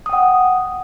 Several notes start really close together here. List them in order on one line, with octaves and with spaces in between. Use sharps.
D#6 G5 F#5